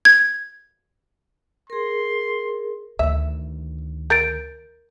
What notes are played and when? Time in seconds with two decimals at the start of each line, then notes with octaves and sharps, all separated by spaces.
0.05 G#6
1.70 G#4 A#4 C6
2.99 D2 D#3 E5
4.10 A#4 G6 A6 D7